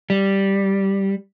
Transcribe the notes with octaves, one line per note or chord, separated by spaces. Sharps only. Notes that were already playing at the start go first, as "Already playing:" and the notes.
G3